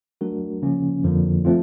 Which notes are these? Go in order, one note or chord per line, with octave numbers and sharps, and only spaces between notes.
F#3 A3 D4 F#4 A#4
C#3 F3 A#3 C#4
F2 D3 F3 A#3
F3 A3 C4 F4